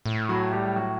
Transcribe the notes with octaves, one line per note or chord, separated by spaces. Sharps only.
A2
F#3 F#4
G3 G4
G4
F#3 F#4